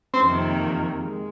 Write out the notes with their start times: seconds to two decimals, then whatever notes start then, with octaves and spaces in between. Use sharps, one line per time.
0.14 C4
0.23 F2 C3 D#3 A#3
1.01 G#3